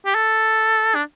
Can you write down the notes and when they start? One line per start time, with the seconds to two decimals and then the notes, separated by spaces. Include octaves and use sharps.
0.06 G4
0.15 A4
0.95 D4